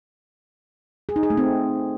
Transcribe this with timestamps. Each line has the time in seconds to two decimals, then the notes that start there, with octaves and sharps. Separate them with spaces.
1.09 G#4
1.16 D#4
1.23 G#4
1.30 A3
1.37 C4